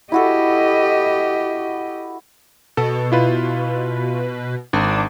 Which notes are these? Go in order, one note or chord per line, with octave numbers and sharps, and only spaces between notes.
E4 F#4 G4 A4 D#5
B2 A4
E4 F4 B4
G#1 D4